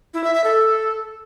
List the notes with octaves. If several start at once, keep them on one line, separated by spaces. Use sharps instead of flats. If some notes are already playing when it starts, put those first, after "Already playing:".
E4
E5
E5
A4